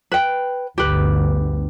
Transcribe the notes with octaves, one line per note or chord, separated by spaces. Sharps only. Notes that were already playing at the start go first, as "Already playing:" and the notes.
B4 G5
G1 D2 G4 B4